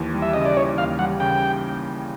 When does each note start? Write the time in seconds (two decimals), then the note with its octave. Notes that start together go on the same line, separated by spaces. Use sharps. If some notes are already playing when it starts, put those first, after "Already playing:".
Already playing: D#2 E3
0.14 G3
0.22 E5
0.33 C#3 D#5
0.45 D5
0.57 E3 C#5
0.78 D#2 F5
0.99 G3 F#5
1.20 C#3 G5